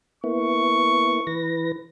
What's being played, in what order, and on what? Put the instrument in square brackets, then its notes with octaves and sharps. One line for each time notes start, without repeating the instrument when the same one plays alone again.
[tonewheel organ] A#3 B3 E4 [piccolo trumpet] C#6
[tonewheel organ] E3 B4 A#6